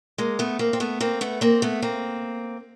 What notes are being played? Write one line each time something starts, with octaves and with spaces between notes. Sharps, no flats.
G#3 A#3
A3 B3
A#3 C4
C4
A3 B3
A#3 C4
A3 B3
A#3 C4
A3 B3
A#3 C4